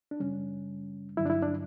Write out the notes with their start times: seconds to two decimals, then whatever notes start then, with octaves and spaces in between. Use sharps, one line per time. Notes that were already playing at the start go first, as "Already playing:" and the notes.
0.11 D4
0.20 F#2 C#3 G3 C#4
1.17 G2 D3 F#3 E4
1.26 D4
1.30 E4
1.42 D4